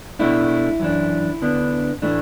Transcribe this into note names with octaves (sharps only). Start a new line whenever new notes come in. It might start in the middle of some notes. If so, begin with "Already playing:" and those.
B2 A3 D4 E4
F#2 E3 D4
D3 B3 D4
A2 E3 A3 D4